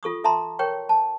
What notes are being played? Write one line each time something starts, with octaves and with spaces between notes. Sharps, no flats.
F4 A4 C#6 D#6
A4 E5 A5 A#5 C6
A#4 C#5 G5 C#6
A5